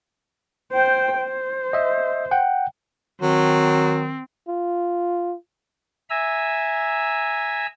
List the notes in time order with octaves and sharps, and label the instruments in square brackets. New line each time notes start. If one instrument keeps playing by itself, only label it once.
[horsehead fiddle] C5 G5
C5
[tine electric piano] D#5 E5
F#5 G5
[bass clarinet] D#3 [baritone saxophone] F#3 [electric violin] C4
[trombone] F4
[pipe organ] E5 G#5 A#5 E6